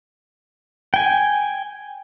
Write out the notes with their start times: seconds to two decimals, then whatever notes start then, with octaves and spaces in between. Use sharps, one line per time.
0.94 G5 G#5